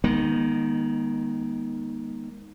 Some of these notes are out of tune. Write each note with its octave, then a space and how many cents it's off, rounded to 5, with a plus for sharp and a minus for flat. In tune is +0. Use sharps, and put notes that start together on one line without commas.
D#3 +0 G#3 -15 B3 -45